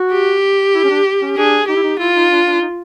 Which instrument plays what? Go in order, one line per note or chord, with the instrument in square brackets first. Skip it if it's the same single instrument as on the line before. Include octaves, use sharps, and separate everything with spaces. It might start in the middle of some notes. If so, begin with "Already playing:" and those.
Already playing: [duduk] F#4
[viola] G4
[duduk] E4
C#4
D4
C#4
[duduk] D4 [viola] G#4
[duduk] D#4 [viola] G4
[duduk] E4
D#4
[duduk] E4 [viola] F4
[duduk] D#4
D4
D4
D#4